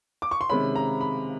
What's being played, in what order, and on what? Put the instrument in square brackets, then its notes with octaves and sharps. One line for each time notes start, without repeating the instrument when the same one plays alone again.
[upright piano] D6
C#6
C6
C3 D#3 G#3 C#4 B5
A#5
B5